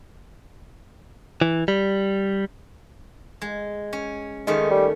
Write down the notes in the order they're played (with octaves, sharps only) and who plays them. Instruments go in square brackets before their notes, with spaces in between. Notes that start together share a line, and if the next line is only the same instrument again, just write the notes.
[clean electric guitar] E3
G3
[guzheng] G#3
C#4
[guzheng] D#3 A3 C#4 [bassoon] G#3
[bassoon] G3